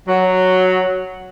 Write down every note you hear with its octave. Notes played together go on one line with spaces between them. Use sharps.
F#3